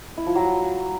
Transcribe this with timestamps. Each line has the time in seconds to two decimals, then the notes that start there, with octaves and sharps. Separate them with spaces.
0.17 E4
0.26 F3
0.35 F#3